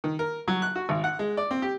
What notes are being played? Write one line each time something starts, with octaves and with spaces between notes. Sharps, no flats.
D#3
A#4
F#3
F#6
F#4
G#1
F#5
G#3
D5
C4
G4